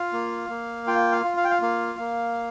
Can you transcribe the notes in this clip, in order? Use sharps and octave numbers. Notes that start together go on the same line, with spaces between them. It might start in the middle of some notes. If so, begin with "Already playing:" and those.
Already playing: F4 F5
A#3
A#3
F4 G5
F5
F4
F5
G5
F5
A#3 F5
A#3